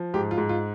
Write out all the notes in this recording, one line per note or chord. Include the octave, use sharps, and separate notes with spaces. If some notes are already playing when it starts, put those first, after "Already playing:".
Already playing: F3
G#2 G4
F4
G#2
F4